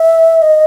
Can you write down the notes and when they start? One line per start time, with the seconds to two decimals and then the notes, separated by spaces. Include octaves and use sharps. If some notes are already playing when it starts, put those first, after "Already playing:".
Already playing: E5
0.42 D#5